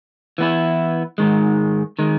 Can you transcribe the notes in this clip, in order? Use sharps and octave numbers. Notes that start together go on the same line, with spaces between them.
E3 B3 E4
G#2 D#3 G#3
D#3 G#3